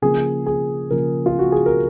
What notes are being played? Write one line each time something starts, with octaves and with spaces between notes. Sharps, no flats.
C#3 F3 A#3 G#4
G#4
C#3 F3 A#3 A#4
F4
F#4
G#4
A#4